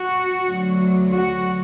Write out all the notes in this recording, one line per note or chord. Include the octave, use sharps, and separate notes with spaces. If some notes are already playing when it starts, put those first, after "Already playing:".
Already playing: F#4
D2 D3 F#3
F#4